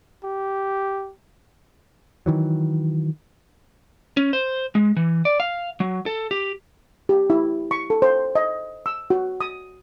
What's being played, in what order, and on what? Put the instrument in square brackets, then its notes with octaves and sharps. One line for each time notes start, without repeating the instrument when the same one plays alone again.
[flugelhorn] G4
[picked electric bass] D#3 E3 F#3
[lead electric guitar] C#4
C5
G#3
E3
D5
F5
F#3
A4
G4
[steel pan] G4
E4
C#6
A4
C5
D#5
E6
F#4
D#6